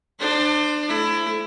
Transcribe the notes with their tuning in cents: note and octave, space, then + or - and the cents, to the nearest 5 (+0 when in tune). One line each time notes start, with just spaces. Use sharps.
D4 +30 C5 +0
A3 -25 E4 +20